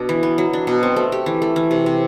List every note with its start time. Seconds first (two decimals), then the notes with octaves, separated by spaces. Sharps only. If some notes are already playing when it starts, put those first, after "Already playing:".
Already playing: B2 D4
0.09 E3
0.23 B3
0.38 F#3
0.53 D4
0.67 B2
0.83 C4
0.96 A3
1.12 G4
1.26 E3
1.42 A3
1.56 E3
1.71 C3
1.86 C3